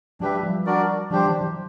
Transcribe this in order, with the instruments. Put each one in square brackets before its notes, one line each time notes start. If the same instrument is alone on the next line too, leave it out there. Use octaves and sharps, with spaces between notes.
[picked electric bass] F#3 G#3 [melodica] D4 G4 B4 E5
[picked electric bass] F3 G3
[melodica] D4 F#4 A#4 D5
[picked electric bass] F3 G3 [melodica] D4 G4 C5
[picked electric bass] E3 F#3
E3 F#3